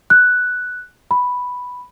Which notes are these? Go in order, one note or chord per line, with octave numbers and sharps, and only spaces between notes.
F#6
B5